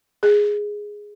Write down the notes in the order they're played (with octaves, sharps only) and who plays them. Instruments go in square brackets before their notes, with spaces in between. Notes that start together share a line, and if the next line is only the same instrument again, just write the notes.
[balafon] G#4